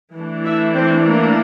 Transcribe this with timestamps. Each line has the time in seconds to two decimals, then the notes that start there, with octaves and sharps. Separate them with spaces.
0.15 E3 A3 D4
0.45 E4 E5
0.75 C4 C5
1.05 A#3 A#4